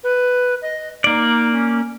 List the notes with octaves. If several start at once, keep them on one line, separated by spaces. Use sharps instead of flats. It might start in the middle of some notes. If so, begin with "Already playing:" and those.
B4
D#5
A#3 D#4 D5
C#4